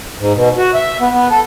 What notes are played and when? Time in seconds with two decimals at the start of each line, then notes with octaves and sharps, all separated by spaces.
0.19 G#2
0.35 B2
0.58 F#4
0.74 E5
1.00 B3
1.13 B3
1.31 A4